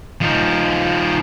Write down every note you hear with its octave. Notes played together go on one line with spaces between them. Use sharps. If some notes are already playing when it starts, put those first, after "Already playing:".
F3 D#4